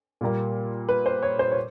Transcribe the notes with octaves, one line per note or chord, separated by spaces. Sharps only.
A#2 G3 A#3
B4
C5
C#5
C5
C#5